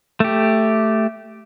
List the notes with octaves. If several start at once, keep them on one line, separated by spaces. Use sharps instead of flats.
A3 G4